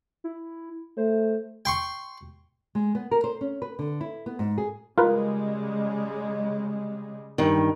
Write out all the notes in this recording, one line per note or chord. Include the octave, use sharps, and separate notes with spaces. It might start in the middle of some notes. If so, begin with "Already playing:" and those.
E4
A3 C5
G5 C6 C#6
G#3
B3
A#4
C5
C#4
B4
D3
E4
B3
G#2
G#4
C#3 G3 G#3 F4 A#4 B4
G2 D#3